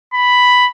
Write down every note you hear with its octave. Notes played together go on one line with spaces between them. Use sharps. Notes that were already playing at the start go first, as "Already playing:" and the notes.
B5